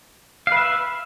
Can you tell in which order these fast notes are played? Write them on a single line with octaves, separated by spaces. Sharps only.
F5 B4 E5